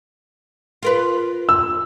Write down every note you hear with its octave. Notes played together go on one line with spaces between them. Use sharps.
F4 A#4 B4
E6